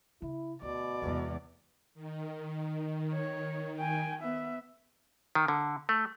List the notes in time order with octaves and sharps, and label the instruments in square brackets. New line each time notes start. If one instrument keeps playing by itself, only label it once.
[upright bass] C#3 [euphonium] E4
[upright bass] D2 [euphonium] B2 [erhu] D5
[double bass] E2 [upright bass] C3 G#3
[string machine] D#3
[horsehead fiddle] C#5
G5 G#5
B3 E5
[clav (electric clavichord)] D#3
D3
A3